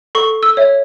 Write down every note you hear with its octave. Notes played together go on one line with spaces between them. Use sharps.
A4 C#6
E6
C#5 E5